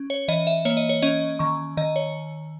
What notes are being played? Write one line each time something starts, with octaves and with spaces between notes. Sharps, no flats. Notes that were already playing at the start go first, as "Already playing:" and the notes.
Already playing: C#4
C#5
E3 D#5
E5
A#3 C#5
D#5
C#5
C#4 D#5
D#3 C#6
D#3 D#5
C#5